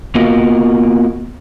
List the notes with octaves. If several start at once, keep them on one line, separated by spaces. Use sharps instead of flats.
A#3 B3 F4 F#4 A#4 D#5